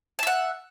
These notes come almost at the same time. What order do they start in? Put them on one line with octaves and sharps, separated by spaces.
A5 E5 F#5